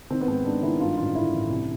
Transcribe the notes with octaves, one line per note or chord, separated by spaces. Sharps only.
D#3 C4
B3
G#2 C4
G#2 D4
D#3 E4
G2 F4
A1 F4
D3 E4
A1
C2